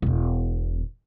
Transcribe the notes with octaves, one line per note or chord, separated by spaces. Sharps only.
E1 B2